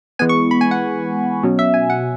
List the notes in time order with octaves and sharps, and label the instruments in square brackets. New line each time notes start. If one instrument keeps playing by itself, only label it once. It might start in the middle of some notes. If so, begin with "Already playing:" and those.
[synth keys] E3 G#3 B3 G#5
C#6
B5
G#5
F#5
B2 F#3 C#4
E5
G#5
F#5